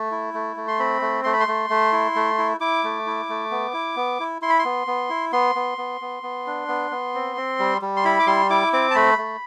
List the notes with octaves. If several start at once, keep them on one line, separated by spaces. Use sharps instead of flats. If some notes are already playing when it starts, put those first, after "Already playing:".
Already playing: A3
E4
A3
A3
C6
C4 B5
A3
A3 C6
B5
C6
A3
A3
E4
A3
E4
E4 D6
A3
E4
A3
B3
E4
B3
E4
E4 C6
B5
C6
B3
B3
E4
B3 C6
B3
B3
B3
B3
D4
B3
B3
C4
C4
G3
G3
C6
E4 B5
D6
G3 C6
E4 D6
C4 D6
A5
A3 B5
A3